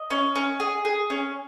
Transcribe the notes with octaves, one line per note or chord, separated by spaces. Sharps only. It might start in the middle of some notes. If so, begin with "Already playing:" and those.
Already playing: D#5
C#4
C#4
G#4
G#4
C#4